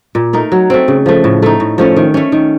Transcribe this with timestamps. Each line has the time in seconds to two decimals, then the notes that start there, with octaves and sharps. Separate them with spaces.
0.15 A#2
0.33 A3 D#4 A#4
0.52 F#3
0.70 A3 C4
0.88 C#3
1.06 F3 A3
1.24 A2
1.42 A3 D#4
1.60 A2
1.78 F3 A3 C#4
1.96 D#3
2.14 A3 C#4
2.32 D#3